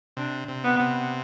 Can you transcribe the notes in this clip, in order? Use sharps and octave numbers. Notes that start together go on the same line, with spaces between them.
C3 D4
C3
B3
C3